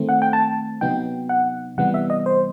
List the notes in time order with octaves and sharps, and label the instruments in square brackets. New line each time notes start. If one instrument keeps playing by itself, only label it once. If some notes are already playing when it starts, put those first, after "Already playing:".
Already playing: [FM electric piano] D#3 A3 C4
F#5
G5
A5
C3 F#3 B3 D#4 G5
F#5
C3 E3 G3 B3 F#5
E5
D#5
C5